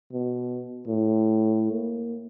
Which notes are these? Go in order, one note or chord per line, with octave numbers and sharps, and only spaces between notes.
B2
A2
A#3